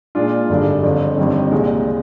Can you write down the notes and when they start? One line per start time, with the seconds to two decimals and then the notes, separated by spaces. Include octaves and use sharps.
0.15 A#2 G#3 D4 F4
0.49 G#1 G2 D3 G#3 D4
0.83 G1 F2 D3
1.17 G1 F2 D#3 G3 C4
1.51 C2 A#2 G#3